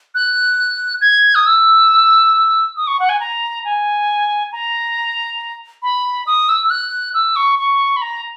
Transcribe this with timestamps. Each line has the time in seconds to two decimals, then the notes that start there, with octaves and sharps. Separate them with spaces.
0.15 F#6
1.01 G#6
1.35 D#6
1.46 E6
2.77 D#6
2.87 C#6
2.99 F#5
3.09 G#5
3.20 A#5
3.65 G#5
4.52 A#5
5.83 B5
6.27 D#6
6.49 E6
6.64 E6
6.70 F#6
7.14 E6
7.36 C#6
7.59 C#6
7.97 B5
8.02 A#5